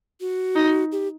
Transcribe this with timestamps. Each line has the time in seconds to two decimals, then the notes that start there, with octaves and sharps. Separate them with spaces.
0.21 F#4
0.56 D#4
0.92 G4